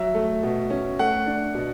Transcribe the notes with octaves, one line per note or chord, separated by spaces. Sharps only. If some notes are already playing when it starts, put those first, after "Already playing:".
Already playing: F#3 E5
A3
B2
C#4
A3 F#5
D4
B2